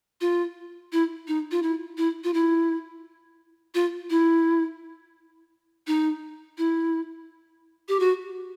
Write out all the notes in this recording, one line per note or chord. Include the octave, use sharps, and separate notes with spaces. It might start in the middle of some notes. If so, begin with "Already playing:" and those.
F4
E4
D#4
F4
E4
E4
F4
E4
F4
E4
D#4
E4
G4
F#4